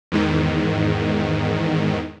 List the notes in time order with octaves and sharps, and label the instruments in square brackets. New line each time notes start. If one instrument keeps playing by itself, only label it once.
[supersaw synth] E2 G#2 D#3